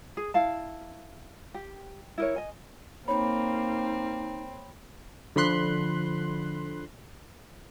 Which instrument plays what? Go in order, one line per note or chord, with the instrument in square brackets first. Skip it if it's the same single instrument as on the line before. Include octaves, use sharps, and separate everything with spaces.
[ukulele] G#4
E4 F5 A5
G4
E4 A#4 C#5
D#5 G#5
[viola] A#3 [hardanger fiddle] C4 [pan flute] D#4 [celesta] C#5 B5
[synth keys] D3 F3 B5 C6 F#6